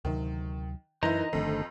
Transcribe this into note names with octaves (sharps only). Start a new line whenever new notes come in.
D2 C3 D#3 F#3
F#2 E3 D#4 E4 A#4 C5 D#5 A#5
G1 C2 F2 D3 D#3 A3